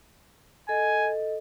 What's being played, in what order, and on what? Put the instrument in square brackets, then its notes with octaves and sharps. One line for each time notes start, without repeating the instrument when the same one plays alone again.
[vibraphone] A4 D#5 [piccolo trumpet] G#5